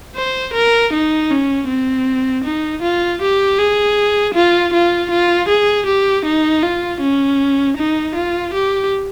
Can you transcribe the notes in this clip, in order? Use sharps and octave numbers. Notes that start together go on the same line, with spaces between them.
C5
A#4
D#4
C#4
C4
D#4
F4
G4
G#4
F4
F4
F4
G#4
G4
D#4
F4
C#4
D#4
F4
G4